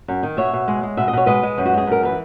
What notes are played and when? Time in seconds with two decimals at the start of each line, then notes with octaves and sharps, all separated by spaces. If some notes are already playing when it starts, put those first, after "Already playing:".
0.08 F#2
0.23 D#3
0.37 B2 C#5 E5
0.53 B2
0.68 G#3
0.83 G#3
0.97 B2 E5
1.08 D#5
1.13 B2 C#5
1.26 G#3 B4 D#5
1.43 G#3
1.58 F#2
1.65 F#4
1.73 G#3 G#4
1.87 F#2 A#4
2.03 E3 B4